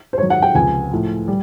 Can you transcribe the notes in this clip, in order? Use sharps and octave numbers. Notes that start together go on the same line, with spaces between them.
C5
G#2 D#3 F#3 C#5
F#5
G5
C#2 C3 F3 G#5
A2 F3
G3